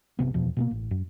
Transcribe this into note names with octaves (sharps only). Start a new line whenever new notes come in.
G1 D#2 C3 B3
D#1 E2 B2 F3
B2 A3 A#3
A1
F#2